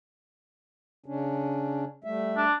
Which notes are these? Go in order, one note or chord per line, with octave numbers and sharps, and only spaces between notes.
C#3 C#4 D4
G3 A3 E5
D4